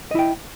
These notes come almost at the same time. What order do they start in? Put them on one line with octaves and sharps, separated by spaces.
D#5 E4 G5